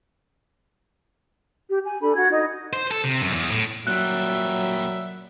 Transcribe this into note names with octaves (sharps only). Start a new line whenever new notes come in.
G4
G#5
D4 A4 B5
F#4 F#5 G#6
D#4 D#5
C5
A4
C3
F#2
E2
A2
A#2 F#3 G3 E5 F#6